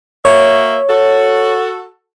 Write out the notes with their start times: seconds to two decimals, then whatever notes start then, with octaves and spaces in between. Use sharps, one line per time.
0.25 A#3 F#4 C#5 E5
0.89 F#4 A4